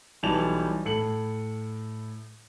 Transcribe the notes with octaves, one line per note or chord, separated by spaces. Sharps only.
B1 E3 G3 A5 F7
A2 A4 C#7 F#7